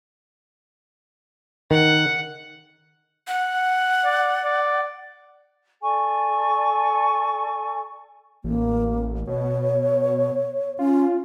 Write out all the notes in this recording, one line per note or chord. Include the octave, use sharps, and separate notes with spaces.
D#3 F#5
F#5
D5
D5
A4 D5 G#5 C#6
A1 A#3
B2 C#5
C#4 F4